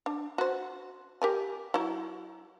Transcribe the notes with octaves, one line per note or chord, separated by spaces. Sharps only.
D4
F#4 C5
G4 A#4 G#5
F#3 E4